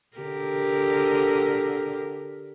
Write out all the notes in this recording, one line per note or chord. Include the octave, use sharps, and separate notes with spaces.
D3 G4 A#4